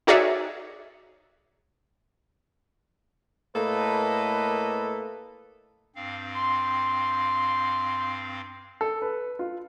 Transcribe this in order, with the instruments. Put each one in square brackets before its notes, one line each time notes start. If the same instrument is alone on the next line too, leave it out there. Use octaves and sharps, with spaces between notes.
[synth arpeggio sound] D#4 F#4 G#4 C#5 D5 E5
[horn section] A2 A3 A#3 A4 B4 D#5
[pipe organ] G2 C4 F5
[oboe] C6
[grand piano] A4
B4
F4